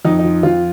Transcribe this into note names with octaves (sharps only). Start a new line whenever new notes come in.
F2 D#4
D#4
F3
F2 F4